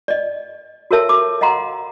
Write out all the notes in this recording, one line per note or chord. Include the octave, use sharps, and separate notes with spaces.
D5 D#5
F#4 A4 A#4 C#5 E5 A5
D6
D#5 F5 F#5 A#5 C6